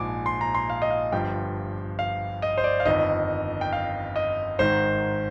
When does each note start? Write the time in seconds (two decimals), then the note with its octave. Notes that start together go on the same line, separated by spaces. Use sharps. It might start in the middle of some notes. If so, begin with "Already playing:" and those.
Already playing: A#1 G#2 F3 G#5 D6
0.26 C6
0.41 A#5
0.55 C6
0.70 F5
0.82 D#5
0.91 F5
1.12 G1 G2 F3 G5
1.99 F5
2.42 D#5
2.58 C5
2.64 D5
2.80 F5
2.85 G1 F2 D#3 D#5
3.61 G5
3.73 F5
4.16 D#5
4.59 G#1 G#2 D#3 C5